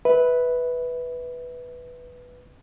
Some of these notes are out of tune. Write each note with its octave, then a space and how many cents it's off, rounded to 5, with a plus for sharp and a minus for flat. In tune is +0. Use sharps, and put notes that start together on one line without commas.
B4 +0 E5 -30